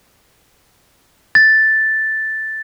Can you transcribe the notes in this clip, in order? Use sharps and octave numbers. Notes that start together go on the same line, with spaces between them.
A6